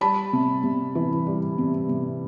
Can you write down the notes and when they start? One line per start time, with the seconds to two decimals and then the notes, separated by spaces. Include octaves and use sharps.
0.01 G3 A5 B5
0.33 C3
0.64 C3
0.95 E3
1.26 G3
1.58 C3
1.89 C3